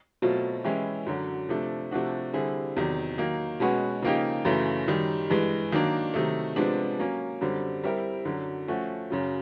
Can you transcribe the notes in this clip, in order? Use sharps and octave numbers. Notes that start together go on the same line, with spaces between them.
B2 F#3 A3 C4 F4
E3 G#3 C#4 E4 G4
F#2 D3 F#3
C3 F3 A3 D4
C3 F3 A3 D4 F#4
D3 G3 C4 E4 G#4
E2 C3 D#3 F#3
D#3 F#3 A#3
B2 G#3 C#4 F#4 B4
C#3 F3 A#3 D#4 G4
F#2 C#3 E3 A3
F#2 D#3 G3
G2 E3 G#3
D#3 F#3 A#3 D4
C3 D#3 F#3 A3
C3 F3 G#3 B3 D4
F#3 A#3 C#4
F#2 D3 G3 C4
G3 C4 E4 G4 A#4
F#2 D3 F#3
F3 A3 C#4 F#4
F#2 C#3 F#3